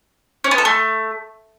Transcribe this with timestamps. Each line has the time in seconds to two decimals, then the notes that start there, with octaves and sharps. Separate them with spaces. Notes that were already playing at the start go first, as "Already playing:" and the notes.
0.44 C#4
0.51 B3
0.58 A4
0.65 A3